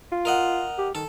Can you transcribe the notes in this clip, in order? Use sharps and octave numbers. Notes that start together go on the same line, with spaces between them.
F4
A#4 D#5 F#5
G4
D#3 A4